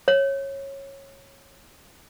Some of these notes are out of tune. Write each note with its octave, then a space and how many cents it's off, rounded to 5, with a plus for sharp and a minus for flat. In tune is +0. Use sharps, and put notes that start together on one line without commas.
C#5 -15